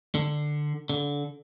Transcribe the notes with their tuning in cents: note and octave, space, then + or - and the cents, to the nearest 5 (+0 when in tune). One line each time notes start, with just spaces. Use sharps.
D3 +15
D3 -25